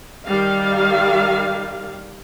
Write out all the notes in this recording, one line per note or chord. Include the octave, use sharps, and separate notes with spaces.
D#3 G3 F5